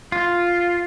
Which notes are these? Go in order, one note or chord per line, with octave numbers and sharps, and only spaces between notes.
F4